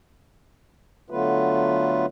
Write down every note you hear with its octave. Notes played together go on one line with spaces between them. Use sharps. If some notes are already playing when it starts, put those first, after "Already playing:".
D3 F#3 A3 B3 F4 B4